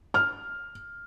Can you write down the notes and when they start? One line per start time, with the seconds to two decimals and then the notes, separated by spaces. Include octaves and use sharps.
0.14 F6